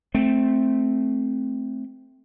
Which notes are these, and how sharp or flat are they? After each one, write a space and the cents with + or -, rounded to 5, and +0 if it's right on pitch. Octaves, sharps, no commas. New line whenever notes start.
A3 -10 C4 +0